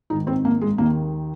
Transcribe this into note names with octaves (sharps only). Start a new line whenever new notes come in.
G#2 D#3 D#4
C4
A#3
G#3
D#2 D#3 A#3